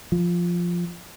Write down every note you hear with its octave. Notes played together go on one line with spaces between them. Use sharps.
F3